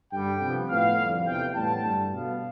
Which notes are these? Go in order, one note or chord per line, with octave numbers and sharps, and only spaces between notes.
G2 D3 G3 G5
C3 F3 B3
A2 F3 B3 F5
F2 D3 G3
E2 C3 E3 G5
A2 G3 B3 A5
G2 D3 G3
B2 B3 F5